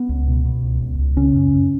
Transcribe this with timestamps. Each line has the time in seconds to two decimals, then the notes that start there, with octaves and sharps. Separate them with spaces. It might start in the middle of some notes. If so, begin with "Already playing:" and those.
Already playing: B3
0.09 C#2
0.27 B2
0.45 B2
0.63 C#2
0.81 C#2
0.99 C#2
1.16 C#3 C#4
1.35 F#2
1.53 F#2